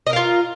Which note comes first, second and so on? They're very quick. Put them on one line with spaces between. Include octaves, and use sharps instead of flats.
D#5 A#4 F5 F4